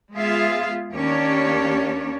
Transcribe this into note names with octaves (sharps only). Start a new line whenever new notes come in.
G#3 B3 F4 G#4 E5 F5
D#2 A#3 C#4 D4 G4 C#5